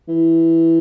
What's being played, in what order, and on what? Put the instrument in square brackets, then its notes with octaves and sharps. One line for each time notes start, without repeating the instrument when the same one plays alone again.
[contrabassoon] E3